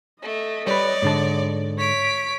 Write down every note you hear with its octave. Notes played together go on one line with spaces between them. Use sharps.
A3 D#5
G3 B4 C#5 D5
G#2 D3 A5
C#5 B6 D7